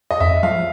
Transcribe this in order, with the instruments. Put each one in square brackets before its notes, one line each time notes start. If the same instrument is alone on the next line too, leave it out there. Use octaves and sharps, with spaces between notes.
[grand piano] D#5
[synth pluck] F2 [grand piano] E5
[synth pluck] F3 [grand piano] F5